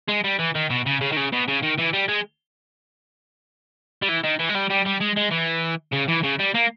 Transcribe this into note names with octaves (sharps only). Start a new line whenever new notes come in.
G#3
G3
E3
D#3
B2
C#3
C#3
D#3
C#3
B2
C#3
D#3
E3
G3
G#3
G3
E3
D#3
E3
G#3
G3
G3
G3
G#3
G#3
E3
C#3
E3
C#3
G3
A#3